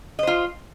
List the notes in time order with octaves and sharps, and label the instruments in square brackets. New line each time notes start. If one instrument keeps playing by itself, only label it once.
[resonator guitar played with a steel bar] D#5
C5
F4